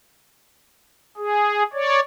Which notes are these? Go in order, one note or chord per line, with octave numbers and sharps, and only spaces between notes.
G#4
C#5 D5